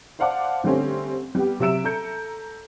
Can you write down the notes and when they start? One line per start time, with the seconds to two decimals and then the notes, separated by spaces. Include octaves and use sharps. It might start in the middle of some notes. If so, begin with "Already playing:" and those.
0.19 C5 D5 F5 F#5 A5 D6
0.64 D3 G3 A3 C4 C#4
1.35 G3 B3 G4
1.60 C3 F#3 E5 E6 D7 E7
1.84 A4 A#5 G6 C#7